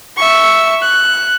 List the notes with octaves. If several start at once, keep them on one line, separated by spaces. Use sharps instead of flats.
E5 C#6
F#6